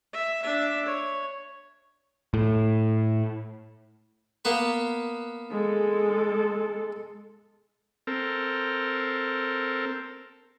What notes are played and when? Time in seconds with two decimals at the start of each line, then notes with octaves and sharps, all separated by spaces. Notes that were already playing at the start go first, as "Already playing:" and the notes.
0.12 E5
0.42 D4 E5
0.85 C#5
2.34 A2
4.45 A#3 B3 B4
5.51 G#3 A4
8.07 C4 A4 A#4